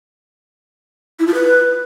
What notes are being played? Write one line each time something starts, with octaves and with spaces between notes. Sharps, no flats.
E4
F4
B4